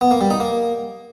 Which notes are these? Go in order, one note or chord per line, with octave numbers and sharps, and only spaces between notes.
B3
A#3
G3
D#4
A#3